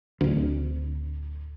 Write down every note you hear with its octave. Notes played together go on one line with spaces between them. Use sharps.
D1 D2